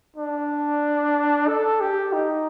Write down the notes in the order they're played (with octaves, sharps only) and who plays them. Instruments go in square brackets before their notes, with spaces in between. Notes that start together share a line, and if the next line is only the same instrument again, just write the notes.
[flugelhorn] D4
A4
G4
D#4